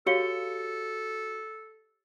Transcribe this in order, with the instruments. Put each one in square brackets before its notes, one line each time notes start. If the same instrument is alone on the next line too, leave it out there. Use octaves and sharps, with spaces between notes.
[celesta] F#4 C#7 G7 [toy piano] G4 C#5 F5 [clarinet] A4